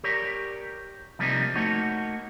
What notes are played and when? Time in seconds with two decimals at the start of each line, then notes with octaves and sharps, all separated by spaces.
0.04 G4 A#4 C#5 D5
1.19 C3 F3 G3 A#3 C4 D#4
1.55 A3 A#3 D#4 F#4 C#5